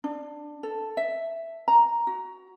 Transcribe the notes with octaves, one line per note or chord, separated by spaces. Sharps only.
D4
A4
E5
A#5
F#4